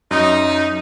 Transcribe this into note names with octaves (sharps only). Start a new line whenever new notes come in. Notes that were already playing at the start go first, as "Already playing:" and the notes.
F#2 D#4